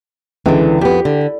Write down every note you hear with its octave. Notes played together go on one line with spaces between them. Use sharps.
C#2 D3 E3
F2 B3 G4
D3